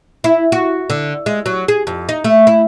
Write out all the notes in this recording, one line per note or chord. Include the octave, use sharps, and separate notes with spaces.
E4
F#4
D3
G#3
F#3
G#4
F2
D#4
A3
E4